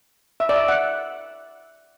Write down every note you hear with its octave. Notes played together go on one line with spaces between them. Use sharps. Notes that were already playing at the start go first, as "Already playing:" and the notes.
E5
D5
E5
F#5